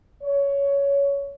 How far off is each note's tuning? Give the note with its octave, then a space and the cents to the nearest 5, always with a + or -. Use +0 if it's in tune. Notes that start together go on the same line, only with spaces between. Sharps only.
C#5 +15